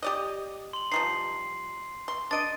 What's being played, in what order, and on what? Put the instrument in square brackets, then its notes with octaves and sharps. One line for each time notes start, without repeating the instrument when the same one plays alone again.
[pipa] G4 D5 D#5
[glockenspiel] C6 F#7
[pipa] F3 G3 D#4 [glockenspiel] C7
[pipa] C6
[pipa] D4 D#5 [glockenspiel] A6 D7 D#7